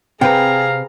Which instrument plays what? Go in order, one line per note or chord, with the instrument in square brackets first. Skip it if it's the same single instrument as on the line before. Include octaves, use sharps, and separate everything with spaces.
[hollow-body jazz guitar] C3 C4 B4 [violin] G#4 A#5 [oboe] F5 [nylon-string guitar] G5